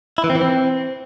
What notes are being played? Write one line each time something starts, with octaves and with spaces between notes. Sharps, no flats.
E4
E3
C4
E3
C4